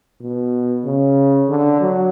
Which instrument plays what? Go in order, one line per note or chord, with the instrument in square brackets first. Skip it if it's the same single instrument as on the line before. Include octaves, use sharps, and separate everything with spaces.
[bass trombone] B2
C#3
D3
F#3